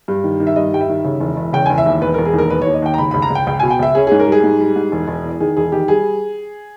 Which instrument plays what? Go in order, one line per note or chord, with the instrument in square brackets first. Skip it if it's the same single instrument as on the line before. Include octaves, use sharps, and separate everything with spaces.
[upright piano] G2
D#3
D#3
E5
G2 D#5
G3 G5
E5
D#3
C#3
E1
E1
C#3 G5
E1 G#5
E5
D#2
E1 B4
E1 A#4
G#4
D#2
A#4
D#2 B4
C#5
D#2
D#5
D#2 G5
A#5
C#2 B5
C#2 B5
A#5
C#2
G5
C#2 G5
B2 G#5
G5
C#2 E5
C#4 G#4
G#2 G#4
A#4
G3 G#4
G#2
G3
G#2
E1
E1
E2
D#3 G#4
E1 G#4
D#3 G4
G3 G#4